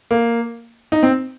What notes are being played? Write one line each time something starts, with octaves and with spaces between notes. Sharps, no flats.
A#3
D#4
C4